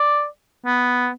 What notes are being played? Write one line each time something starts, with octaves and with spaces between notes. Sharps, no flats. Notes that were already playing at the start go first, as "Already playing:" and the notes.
Already playing: D5
B3